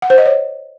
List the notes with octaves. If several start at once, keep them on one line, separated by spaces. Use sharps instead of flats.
F#5
C5
D#5
C#5